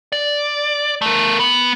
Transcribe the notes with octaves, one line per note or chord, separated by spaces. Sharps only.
D5
A3 A#4
B3